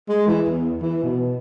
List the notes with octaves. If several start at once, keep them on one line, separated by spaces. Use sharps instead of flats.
G#3
E3
E2
E3
B2